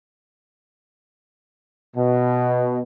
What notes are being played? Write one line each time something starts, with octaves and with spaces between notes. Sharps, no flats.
B2